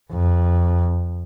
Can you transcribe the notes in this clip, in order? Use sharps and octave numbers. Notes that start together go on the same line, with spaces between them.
F2